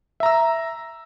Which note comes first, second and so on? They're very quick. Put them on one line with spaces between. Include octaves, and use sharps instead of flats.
E5 A#5 E6